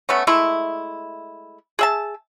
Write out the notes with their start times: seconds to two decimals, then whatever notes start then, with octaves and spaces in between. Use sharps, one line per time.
0.09 A3 B3 C#4
0.27 G#3 A3 E4
1.79 G#4 E5 A5